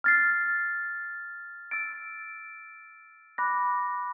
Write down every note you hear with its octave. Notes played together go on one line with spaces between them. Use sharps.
F6 A6 C7
E6 A6 D7
B5 D6 F#6 A#6